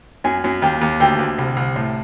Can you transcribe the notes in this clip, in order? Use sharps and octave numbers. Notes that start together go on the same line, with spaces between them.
F#2 G#5
F#2
D#2 G5
D#2
D2 G5
D2
C2
C2
A2